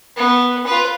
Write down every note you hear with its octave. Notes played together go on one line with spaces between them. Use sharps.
B3
F4 B4